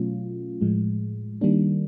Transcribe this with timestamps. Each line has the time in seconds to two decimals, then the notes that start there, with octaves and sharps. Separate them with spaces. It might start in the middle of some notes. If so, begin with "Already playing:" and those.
Already playing: B2 F#3 A3 C#4 F4
0.61 A2 F3 G#3
1.41 D#3 G3 A#3 D4